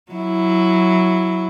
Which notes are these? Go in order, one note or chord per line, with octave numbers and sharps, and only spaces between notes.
F#3 E4